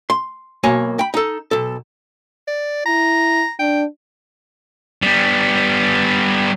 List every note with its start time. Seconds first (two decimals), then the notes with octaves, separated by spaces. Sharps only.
0.10 C6
0.63 B1 B2 A#3 C#5 G#5
0.99 G5 B5
1.14 D#4 A4
1.51 B1 A4
2.47 D5
2.86 E4 A#5
3.59 D4 G5
5.02 G3 B3